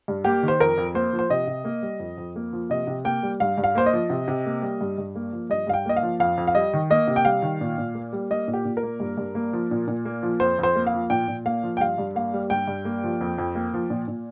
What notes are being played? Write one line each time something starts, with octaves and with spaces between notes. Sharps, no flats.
G2
A#3 G4
D#3
C5
F2 A#4
F2
A#3 C5
F3
C5
C3 D#5
C3
A#3
G3
F2
F2
A#3
F3
C3 D#5
C3
A#3 G5
G3
G2 F5
G2
F5
A#3 C5
D#5
F3
C3
C3
A#3
G3
G2
G2
A#3
F3
G2 D#5
G2 F5
G5
A#3 D#5
F5
F3
F2 F5
F2
F5
G3 D#5
D#3
A#3 D#5
C3
G5
G3 F5
D#3
A#2
A#2
A#3
G3
A#3 D#5
A#2
G4
A#2
A#4
A#3
G2
G2
A#3
F3
A#2
A#2
A#3
F3
F2 C5
F2 C5
A#3
F5
F3
A#2 G5
A#2
A#3 F5
F3
G5
G2 F5
G2
A#3 F5
G3
G2 G5
G2
A#3
F3
F2
F2
A#3
F3
A#2
A#2